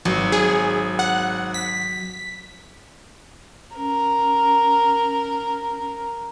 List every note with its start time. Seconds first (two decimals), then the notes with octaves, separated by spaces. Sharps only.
0.05 G#1 F#3
0.32 G#4
0.99 F#5
1.54 B6
3.76 C#4 A#4